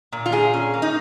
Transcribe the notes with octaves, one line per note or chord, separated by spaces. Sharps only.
A#2
F4
A#2 G#4
C#4
A#3
D#4